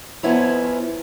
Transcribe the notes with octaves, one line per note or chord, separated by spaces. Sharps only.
F2 F3 B3 C#4 E4 A#5